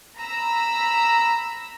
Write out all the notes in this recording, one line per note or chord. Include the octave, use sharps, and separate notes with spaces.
A#5 B5 E6